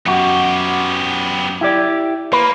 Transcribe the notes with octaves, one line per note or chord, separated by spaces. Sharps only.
F#2 B3 F#4 G4
E4 G4 D5
A#3 B4